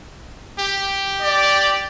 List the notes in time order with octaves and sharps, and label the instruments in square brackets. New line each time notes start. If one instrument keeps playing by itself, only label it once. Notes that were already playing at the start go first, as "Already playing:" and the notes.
[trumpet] G4
[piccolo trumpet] D5